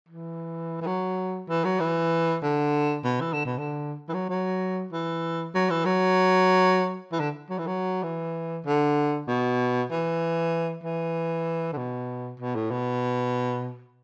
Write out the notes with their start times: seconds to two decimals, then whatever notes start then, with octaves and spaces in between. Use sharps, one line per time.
0.09 E3
0.81 E3
0.87 F#3
1.49 E3
1.65 F#3
1.80 E3
2.43 D3
3.04 B2
3.21 E3
3.33 D3
3.46 B2
3.58 D3
4.09 E3
4.14 F#3
4.29 F#3
4.92 E3
5.55 F#3
5.70 E3
5.85 F#3
7.12 E3
7.20 D3
7.50 F#3
7.59 E3
7.67 F#3
8.03 E3
8.66 D3
9.28 B2
9.91 E3
10.84 E3
11.73 D3
11.78 B2
12.40 B2
12.55 A2
12.71 B2